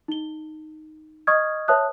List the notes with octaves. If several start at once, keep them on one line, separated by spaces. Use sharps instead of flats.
D#4 G7
D#5 C#6 D#6 F6 G#6
B4 C#5 E5 A5 D#6 F#6